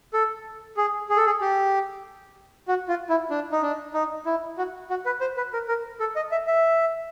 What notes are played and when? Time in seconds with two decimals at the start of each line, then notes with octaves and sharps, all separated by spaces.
0.13 A4
0.77 G#4
1.09 G#4
1.17 A4
1.26 G#4
1.41 G4
2.68 F#4
2.88 F4
3.09 E4
3.30 D4
3.52 D#4
3.62 D4
3.94 D#4
4.26 E4
4.58 F#4
4.90 F#4
5.06 B4
5.21 C5
5.37 B4
5.53 A#4
5.68 A#4
6.00 A4
6.16 D#5
6.31 E5
6.47 E5